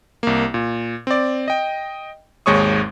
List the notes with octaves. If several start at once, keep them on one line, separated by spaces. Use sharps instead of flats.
C2 A#3
A#2
C4 D5
D#5 G5
G#1 D#2 G#3 C#5 C#6 D#6